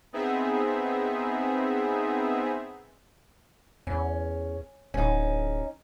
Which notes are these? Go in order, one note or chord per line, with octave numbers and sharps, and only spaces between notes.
B3 C4 D#4 G#4 E5
E2 C#4
D1 C#4 D#4